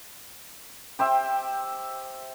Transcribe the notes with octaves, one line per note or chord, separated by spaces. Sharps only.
G4 C5 E5 G5